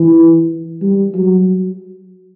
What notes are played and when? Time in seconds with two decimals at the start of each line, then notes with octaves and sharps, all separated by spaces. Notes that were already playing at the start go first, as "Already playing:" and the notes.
Already playing: E3
0.82 G3
1.14 F#3